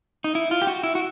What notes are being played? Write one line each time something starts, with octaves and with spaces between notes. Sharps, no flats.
D#4
E4
F4
G4
F#4
E4
F#4